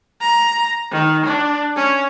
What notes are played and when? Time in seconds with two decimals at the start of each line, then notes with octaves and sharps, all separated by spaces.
0.21 A#5
0.91 D#3
1.25 D4
1.76 C#4